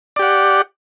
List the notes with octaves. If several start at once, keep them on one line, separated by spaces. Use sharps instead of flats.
G4 D5 F#5